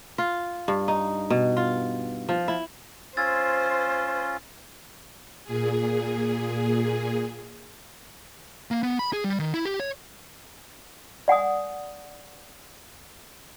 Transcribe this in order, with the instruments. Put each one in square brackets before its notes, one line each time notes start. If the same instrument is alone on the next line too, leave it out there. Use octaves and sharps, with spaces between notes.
[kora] F4
G2
D#4
B2
F4
F3
E4
[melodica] C#4 F4 [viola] C5 [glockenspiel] E6 G#6 A6
[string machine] A#2 G#4
[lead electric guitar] A#3
B3
B5
G#4
G3
D#3
E4
G4
C#5
[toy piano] D5 F#5 G#5 D#6